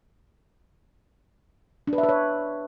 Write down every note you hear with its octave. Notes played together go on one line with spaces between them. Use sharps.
D4
B4
E5
B4
C#5